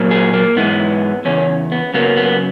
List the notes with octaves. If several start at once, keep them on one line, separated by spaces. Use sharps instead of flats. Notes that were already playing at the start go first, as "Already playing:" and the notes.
Already playing: A#2 F#3 A#3
G#4
A#3
G#2 E3 G#3 B3
E2 C#3 C#4
B3
F#2 C#3 F#3 A#3 B3
B3